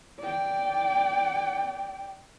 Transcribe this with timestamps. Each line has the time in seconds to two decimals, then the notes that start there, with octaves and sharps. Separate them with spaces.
0.20 D5 G5